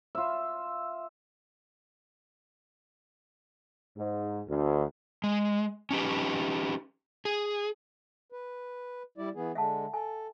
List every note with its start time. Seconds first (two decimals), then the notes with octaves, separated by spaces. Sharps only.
0.15 F4 E5
3.97 G#2
4.48 D2
5.24 G#3
5.91 C#4 D#4 G4 B4
7.25 G#4
8.32 B4
9.18 G3 E4 D5
9.35 E3 B3 G#4
9.55 D3 G#3 E5 F#5 A5
9.94 A4 G#5